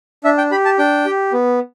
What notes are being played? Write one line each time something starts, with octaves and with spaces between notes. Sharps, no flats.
D4 E5
G5
G4 B5
A5
D4 G5
G4
B3